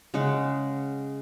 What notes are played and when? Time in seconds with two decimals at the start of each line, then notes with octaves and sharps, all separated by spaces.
0.14 C#3 G#3 F#5